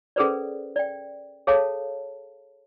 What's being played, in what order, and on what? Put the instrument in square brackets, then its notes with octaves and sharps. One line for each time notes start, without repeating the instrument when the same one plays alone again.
[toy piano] C#4 G#4 A4 B4 C5 D5
D5 G5
G#4 A4 C#5 F5 A5